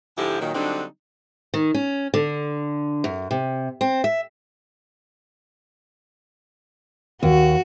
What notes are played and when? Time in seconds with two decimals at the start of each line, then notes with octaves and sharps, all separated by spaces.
0.17 G#2 D3 F3 E4 G4
0.41 A#2 D#3 F#3
0.55 D3 F#3 G3 C4 D4 D#4
1.54 D#3
1.74 C#4
2.14 D3
3.04 F#2
3.31 C3
3.81 C4
4.04 E5
7.23 D#2 F#4